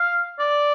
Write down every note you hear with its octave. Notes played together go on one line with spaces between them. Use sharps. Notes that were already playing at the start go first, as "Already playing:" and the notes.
Already playing: F5
D5